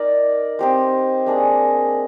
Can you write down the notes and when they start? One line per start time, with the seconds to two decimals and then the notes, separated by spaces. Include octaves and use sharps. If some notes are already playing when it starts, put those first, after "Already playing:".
Already playing: D#4 A#4 D5
0.59 C4 D#4 G4 C5
1.26 A#3 D4 G#4 D#5